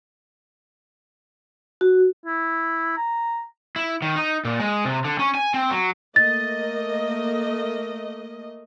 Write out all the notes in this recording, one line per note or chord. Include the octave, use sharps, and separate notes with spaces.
F#4
E4
A#5
E4
D#3
D#4
A#2
G#3
C3
D3
C#4
G#5
C4
F#3
A3 A#3 D#5 A6